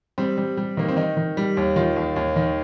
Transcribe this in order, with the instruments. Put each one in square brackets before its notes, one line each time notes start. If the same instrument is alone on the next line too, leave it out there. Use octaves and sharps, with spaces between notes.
[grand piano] G3 C4
G3
G3
D#3 A#3
C4
D#3 D#4
D#3
G3
D#2
D#3 F4
D#2
D#2
D#3